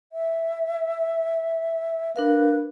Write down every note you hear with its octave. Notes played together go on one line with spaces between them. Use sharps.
E5
D4 A#4 B4 F5